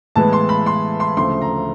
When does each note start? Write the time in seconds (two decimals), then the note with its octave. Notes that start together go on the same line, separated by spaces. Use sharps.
0.16 A2 E3 G#3 B3 A5
0.33 C6
0.49 B5
0.66 C6
1.00 C6
1.17 D2 C#3 F3 A3 C6
1.41 A#5